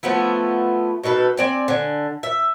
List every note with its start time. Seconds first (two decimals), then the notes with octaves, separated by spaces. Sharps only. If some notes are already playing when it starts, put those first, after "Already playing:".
0.03 F3 A3 B3 E4
1.03 B2 D#4 A4 B4
1.37 C4 D5 G#5
1.68 D3 G#5
2.23 E5